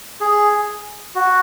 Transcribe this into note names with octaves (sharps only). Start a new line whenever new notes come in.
G#4
F#4